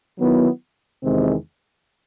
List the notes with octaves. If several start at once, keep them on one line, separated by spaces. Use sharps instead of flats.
D#3 F#3 B3 E4
E2 C3 D#3 G#3 C4